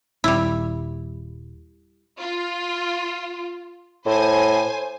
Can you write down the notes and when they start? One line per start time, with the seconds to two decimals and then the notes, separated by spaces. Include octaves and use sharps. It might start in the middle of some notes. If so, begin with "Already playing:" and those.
0.24 D#1 G3 C4 E4
2.20 F4
4.06 A2 C5 G#5